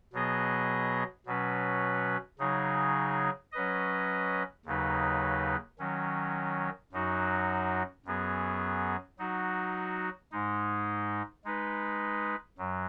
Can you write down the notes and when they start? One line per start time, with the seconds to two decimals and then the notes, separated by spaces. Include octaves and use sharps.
0.13 B2 F#3 B3 G#4 D#5
1.26 B2 F#3 C#4 B4
2.39 C#3 F#3 D#4 G#4
3.52 F#3 C#4 B4 D#5
4.65 D#2 C#3 F#3 D#4 B4
5.79 D#3 F#3 C#4
6.92 F#2 F#3 D#4 F#4
8.06 F#2 F#3 B3 G#4
9.19 F#3 D#4 F#4
10.32 G#2 G#3 D#4
11.45 G#3 D#4 B4
12.58 F#2 F#3